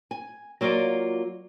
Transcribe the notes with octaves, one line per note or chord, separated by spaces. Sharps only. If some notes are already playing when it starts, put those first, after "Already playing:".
G#5
F#3 A#3 F4 F#4 D5